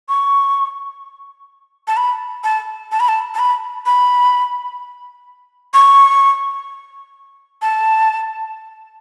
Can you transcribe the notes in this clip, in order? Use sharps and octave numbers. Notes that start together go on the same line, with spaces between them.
C#6
A5
B5
A5
A5
B5
A5
A5
B5
B5
C#6
A5